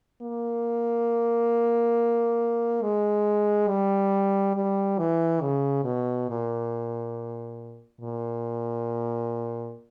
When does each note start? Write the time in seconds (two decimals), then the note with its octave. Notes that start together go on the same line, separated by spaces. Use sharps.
0.22 A#3
2.82 G#3
3.68 G3
4.55 G3
4.99 E3
5.42 C#3
5.84 B2
6.29 A#2
8.01 A#2